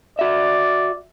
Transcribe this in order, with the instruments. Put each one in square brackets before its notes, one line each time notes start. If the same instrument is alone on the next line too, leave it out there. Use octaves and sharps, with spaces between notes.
[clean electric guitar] F#4 E5 [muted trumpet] D5